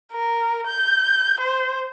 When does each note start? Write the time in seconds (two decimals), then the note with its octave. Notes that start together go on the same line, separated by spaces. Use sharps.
0.12 A#4
0.67 G6
1.40 C5